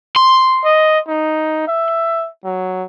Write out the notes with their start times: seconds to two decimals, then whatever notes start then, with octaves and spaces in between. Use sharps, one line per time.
0.16 C6
0.64 D#5
1.08 D#4
1.67 E5
2.44 F#3